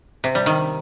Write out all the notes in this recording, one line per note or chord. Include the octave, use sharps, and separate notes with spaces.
C3
G3
D#3